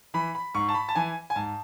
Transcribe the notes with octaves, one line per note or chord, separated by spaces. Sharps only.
E3 B5
B5
G#2 C#6
A5
B5
A5
E3 G#5
G#5
G#2 A5